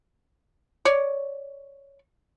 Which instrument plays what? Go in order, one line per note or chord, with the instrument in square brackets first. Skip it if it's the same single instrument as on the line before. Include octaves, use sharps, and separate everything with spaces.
[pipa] C#5 D5